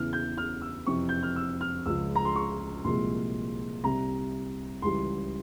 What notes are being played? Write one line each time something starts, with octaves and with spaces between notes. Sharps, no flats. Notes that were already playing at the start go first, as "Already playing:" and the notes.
Already playing: E2 C#3 E3 F6
G6
F6
E6
F2 C3 E3 C#6
G6
F6
E6
F6
C#2 C#3 F3 G#3 E6
A#5
C6
C#6
C2 A#2 F3 G#3 C6
C2 C3 G3 A#5
C#2 C#3 E3 G3 C6